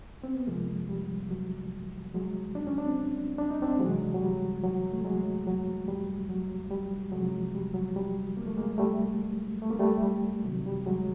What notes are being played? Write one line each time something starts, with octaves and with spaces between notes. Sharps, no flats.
C4
B3
C3 F3 G#3 A#3
G3
F#3
F#3 G#3
D4
C#4
C4 D4
D4
D#4
C4 D4
C3 E3 F#3 G#3
F#3
G3
F#3
A3
F#3 G#3
F#3
G3
F#3
G3
C3 F3 F#3 G#3
G3
F#3
G3
A#3
A3
G#3 A#3
G3 A3
A3
A#3
G3 A3
G3
C3 D#3 F#3
G3
F#3 G#3